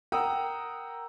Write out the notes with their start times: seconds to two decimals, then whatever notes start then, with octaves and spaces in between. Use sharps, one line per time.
0.12 A#4 F#5 G5 A#5 D#6 E6